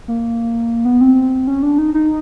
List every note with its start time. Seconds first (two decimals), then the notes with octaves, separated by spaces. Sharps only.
0.08 A#3
0.85 B3
1.01 C4
1.47 C#4
1.63 D4
1.78 D#4
1.94 D#4